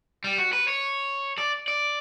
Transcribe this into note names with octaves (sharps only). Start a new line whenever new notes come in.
G3
F#4
B4
C#5
D5
D5